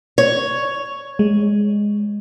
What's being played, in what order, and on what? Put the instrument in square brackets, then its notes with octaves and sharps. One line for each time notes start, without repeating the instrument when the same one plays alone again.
[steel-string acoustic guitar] C#5
[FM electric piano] G#3